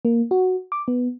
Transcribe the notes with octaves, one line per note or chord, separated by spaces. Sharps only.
A#3
F#4
D6
B3